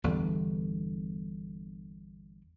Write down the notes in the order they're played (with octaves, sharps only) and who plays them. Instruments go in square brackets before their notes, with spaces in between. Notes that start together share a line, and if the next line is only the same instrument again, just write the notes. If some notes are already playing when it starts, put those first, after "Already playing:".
[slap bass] G1 E2 D3 G3